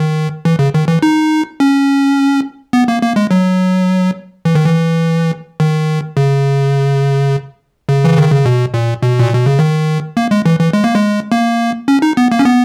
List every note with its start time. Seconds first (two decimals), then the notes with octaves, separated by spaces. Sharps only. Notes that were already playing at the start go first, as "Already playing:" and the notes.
Already playing: D#3
0.45 E3
0.59 C#3
0.74 D#3
0.88 E3
1.03 D#4
1.60 C#4
2.73 B3
2.88 A#3
3.03 A#3
3.16 G#3
3.31 F#3
4.45 E3
4.55 D#3
4.65 E3
5.60 D#3
6.17 C#3
7.89 C#3
8.04 E3
8.18 D#3
8.31 C#3
8.45 B2
8.74 A#2
9.03 B2
9.19 A#2
9.34 B2
9.46 C#3
9.59 D#3
10.17 A#3
10.31 G#3
10.46 E3
10.60 E3
10.73 G#3
10.84 A#3
10.95 G#3
11.32 A#3
11.88 C#4
12.02 D#4
12.17 B3
12.32 A#3
12.39 C#4
12.45 B3